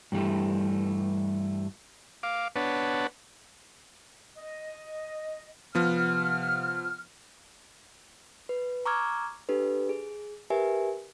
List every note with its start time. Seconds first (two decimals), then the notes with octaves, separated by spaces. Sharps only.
0.12 G2 E3 G3 A3
2.23 F5 D6
2.56 B3 D4 B4 C#5 F#5 A5
4.37 D#5
5.75 C3 F3 B3 F#5 F6
8.49 B4
8.86 A#5 C#6 D6 E6 F6 G#6
9.49 D4 G4 A4 B4
9.89 G#4
10.50 G4 A#4 B4 E5 G#5